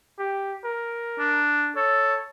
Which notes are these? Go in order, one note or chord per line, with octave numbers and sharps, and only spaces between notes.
G4
A#4
D4
A4 C#5